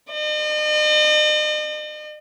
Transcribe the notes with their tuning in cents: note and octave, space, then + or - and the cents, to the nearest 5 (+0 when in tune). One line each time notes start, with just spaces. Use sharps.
D#5 -45